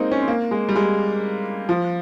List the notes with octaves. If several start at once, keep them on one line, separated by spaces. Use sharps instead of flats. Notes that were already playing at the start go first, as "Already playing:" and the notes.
Already playing: G#3 A#3 C4 D#4
C#4
C4
A#3
G#3
G3
G#3
F3